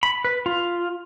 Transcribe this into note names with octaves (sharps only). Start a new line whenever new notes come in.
B5
B4
F4